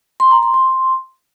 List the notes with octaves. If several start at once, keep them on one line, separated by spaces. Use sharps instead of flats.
C6
A#5
C6
C6